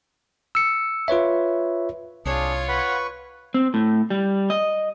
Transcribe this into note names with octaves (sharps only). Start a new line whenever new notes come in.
E6 C#7
F4 B4 C#5 E5
C2 D4 F4 G#4 C#5
B4 F#5 B5 C#6
C4
A2
G3
D#5